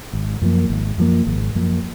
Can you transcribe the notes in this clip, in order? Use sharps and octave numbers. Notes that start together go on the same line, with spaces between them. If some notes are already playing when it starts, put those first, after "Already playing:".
G#1
F#2 F3 A#3
G#1
F#2 F3 A#3
G#1
F#2 F3 A#3